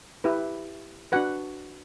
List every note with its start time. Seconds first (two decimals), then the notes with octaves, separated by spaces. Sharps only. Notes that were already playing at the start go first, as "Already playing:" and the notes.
0.24 E4 G4 B4
1.12 D4 F#4 B4 F#5